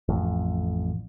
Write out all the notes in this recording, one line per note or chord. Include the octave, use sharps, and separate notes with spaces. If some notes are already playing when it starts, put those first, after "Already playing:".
A1 F2